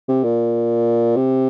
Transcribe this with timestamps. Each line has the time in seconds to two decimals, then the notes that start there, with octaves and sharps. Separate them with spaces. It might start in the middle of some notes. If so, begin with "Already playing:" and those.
0.08 C3
0.24 A#2
1.17 C3